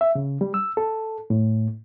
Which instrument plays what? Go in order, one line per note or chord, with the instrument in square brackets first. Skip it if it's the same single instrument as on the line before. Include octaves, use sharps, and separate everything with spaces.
[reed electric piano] E5
C#3
G3
E6
A4
A2